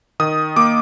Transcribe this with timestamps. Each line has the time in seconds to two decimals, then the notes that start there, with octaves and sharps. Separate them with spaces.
0.20 D#3 D#6
0.56 A#3 D6